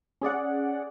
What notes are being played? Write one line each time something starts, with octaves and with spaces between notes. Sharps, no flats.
C#4 G#4 D5 F#5